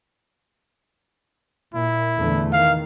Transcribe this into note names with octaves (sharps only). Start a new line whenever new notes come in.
A#2 E4
E2 D3 A3
D#3 F5